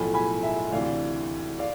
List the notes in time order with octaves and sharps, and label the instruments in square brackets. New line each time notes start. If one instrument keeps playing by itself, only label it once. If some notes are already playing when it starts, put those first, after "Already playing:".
Already playing: [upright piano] B1 A2 F3 A3 G#5 B5
G#5 B5
E5 G#5
D2 C3 E3 D5 F5
D5 F5